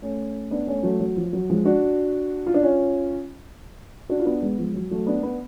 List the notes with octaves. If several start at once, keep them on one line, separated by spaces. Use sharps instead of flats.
A3 C#4
B3 D4
A3 C#4
F#3 A3
F#3
F3
F#3
F3 G#3
D4 F#4
F4
D4
C#4 F4
D4 F#4
F4
B3 D4
G#3 B3
F3 G#3
F#3
F#3 A3
B3 D4
B3 D4